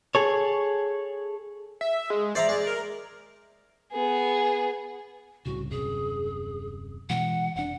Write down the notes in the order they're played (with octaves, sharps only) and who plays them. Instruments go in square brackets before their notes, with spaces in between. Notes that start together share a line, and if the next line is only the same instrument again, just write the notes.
[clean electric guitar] G#4 A4 C#5
[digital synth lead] E5
G#3
[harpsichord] C5 E5 A#5 [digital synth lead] D5
[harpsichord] G#3
[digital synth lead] A#4
[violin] B3 G#4
[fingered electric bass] C2 A2 C#3 [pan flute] F#4
[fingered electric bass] D#1 F#2 C3 [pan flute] G#4
[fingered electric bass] B2 E3 G#3 [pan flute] F#5
[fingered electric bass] F1 D4 [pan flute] F#5